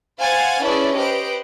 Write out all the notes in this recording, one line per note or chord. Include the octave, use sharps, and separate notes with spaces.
C5 F5 F#5 G#5 A6
C#4 D4 E4 G#4 B4 D5
G4 B4 C5 D#5 D7